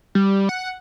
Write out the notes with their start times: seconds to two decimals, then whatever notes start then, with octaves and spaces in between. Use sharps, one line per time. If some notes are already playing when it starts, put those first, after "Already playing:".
0.15 G3
0.49 F#5